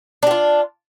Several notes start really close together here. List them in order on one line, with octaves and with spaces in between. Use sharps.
D4 G4 F4